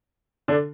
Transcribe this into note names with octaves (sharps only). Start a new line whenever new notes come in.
D3 D4